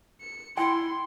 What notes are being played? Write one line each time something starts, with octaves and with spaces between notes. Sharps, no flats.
C#7
E4 G5 C6